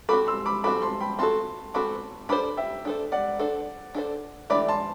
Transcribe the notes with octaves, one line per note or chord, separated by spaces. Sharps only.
C4 F#4 A4 B5 D6
C6 E6
B5 D6
C4 F#4 A4 B5 D6
A5 C6
G5 B5
C4 F#4 A4 A5 C6
C4 F#4 A4 B5 D6
D4 A4 C5 B5 D6
E5 G5
D4 A4 C5
D5 F#5
D4 A4 C5
D4 A4 C5
E3 A3 D4 G4 D5 B5 D6
A5 C6